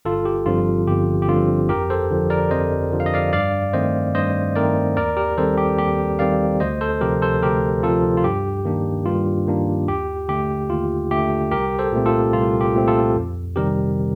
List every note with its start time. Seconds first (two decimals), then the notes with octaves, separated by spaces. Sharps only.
0.05 G1 F4 A4
0.25 G4
0.46 G2 D3 F3 C4 F4
0.87 G1 G4
1.22 G4
1.28 G2 D3 F3 C4 F4
1.69 F2 G4 A#4
1.90 A4 C5
2.11 D3 F3
2.30 A#4 D5
2.51 F2 C5 D#5
2.93 D3 F3
3.00 F5
3.06 D#5
3.14 D5 F5
3.33 G2 D5 F5
3.73 D#3 A3 C4 C5 D#5
4.14 G2 C5 D#5
4.56 D#3 A3 C4 A#4 D5
4.97 D#2 A#4 D5
5.17 G4 A#4
5.37 D#3 G3 C4 A4 C5
5.58 G4
5.78 D#2 G4
6.19 D#3 G3 C4 D5 F5
6.60 D2 C5 D#5
6.81 A4 C5
7.01 C3 F3 G4 A#4
7.22 A4 C5
7.42 D2 G4 A#4
7.83 C3 F3 F4 A4
8.17 F4
8.24 G2 G4
8.65 D#3 A#3 D4
9.05 G2 F4
9.46 D#3 A#3 D4
9.88 D#2 G4
10.29 D3 A3 G4
10.69 D#2 F4
11.11 D3 A3 G4
11.51 C2 G4 A#4
11.79 A4 C5
11.92 A#2 A3 C4
12.06 F4 A4
12.33 C2 F4
12.61 G4
12.74 A#2 A3 C4
12.88 F4 A4
13.15 F2
13.56 C3 D#3 G3 C4 G4 A#4